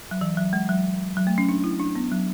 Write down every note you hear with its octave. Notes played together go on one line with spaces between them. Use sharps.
F#3
E3
F#3
G#3
F#3
F#3
A3
C#4
D4
E4
D4
B3
F#3